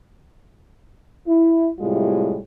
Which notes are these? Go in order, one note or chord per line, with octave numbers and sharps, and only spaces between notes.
E4
A2 C3 G3 G#3 E4 F4